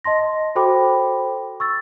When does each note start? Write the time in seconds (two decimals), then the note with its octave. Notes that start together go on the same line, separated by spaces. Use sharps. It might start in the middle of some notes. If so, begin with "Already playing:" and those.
0.04 D#5 A5 C6 A#6
0.56 F#4 A4 C5 G5 B5 D6
1.60 C#6 E6 A6